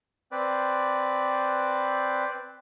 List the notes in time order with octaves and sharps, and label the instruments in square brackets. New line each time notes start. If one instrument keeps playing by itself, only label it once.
[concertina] C4 B4 D5